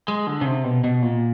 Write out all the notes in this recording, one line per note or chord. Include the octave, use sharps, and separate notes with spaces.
G#3
D3
C#3
C3
B2
B2
A#2